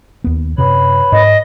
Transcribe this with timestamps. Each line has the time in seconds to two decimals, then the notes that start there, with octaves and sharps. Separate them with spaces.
0.24 D#2 B3
0.58 F#2 C3 B4 C#5 B5
1.12 G#2 D#5